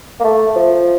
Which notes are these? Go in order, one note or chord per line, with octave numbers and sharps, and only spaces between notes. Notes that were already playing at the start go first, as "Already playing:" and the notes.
A#3
A3
F3